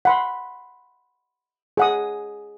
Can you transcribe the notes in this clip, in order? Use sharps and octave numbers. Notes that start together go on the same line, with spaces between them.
F#5 B5 C6
G#4 F#5 D#6